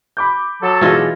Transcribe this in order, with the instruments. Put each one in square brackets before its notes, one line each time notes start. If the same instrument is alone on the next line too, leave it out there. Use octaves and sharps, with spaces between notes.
[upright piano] B5 D6 G6
[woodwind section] F#3 A4 A5
[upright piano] B1 G#3 [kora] E3 F4 D#5